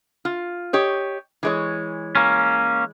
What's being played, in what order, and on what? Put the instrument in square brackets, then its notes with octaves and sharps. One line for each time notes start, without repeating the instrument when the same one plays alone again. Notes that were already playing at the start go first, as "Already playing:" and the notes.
[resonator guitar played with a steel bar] F4
G4 C#5 D#5
E3 G#3 C#5
[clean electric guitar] A#3 C#4